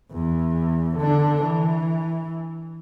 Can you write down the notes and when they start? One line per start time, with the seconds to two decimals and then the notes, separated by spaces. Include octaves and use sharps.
0.13 E2
0.98 D3 D4
1.43 E3